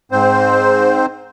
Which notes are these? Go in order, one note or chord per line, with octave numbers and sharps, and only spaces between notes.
G#2 C4 C5